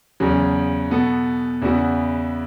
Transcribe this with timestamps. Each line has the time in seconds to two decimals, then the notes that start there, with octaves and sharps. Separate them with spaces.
0.20 E2 C#3 F#3
0.90 B2 B3 A4
1.62 E2 C#3 E3 B3 F#4